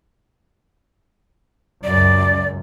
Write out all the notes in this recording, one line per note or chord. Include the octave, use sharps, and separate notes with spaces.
C#2 F#2 D5